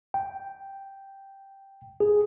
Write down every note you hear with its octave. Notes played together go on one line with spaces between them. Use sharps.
G5
G#4